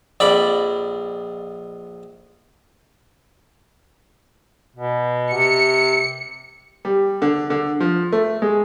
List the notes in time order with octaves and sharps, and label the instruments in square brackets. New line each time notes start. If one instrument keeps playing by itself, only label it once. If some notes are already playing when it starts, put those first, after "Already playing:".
[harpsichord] A#1 F2 D5 B5
[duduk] B2
[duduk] C3 [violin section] C#7
[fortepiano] G3
D3
D3
F3
A3
G#3